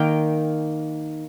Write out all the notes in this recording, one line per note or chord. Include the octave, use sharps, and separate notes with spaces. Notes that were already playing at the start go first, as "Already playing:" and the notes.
Already playing: D#3 A#3 G5